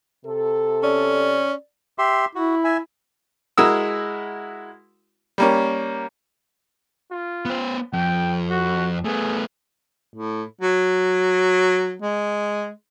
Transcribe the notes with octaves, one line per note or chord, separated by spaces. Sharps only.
C3 A4
C#4 D5
G4 E5 C6
E4 F#4
E5 G#5
G#3 E4 F#4 A#4 D#6 E6
G3 A#3 C#4
F4
B3 C5
F2 G5
F#4
A3 B3 G#4
A2
F#3
G#3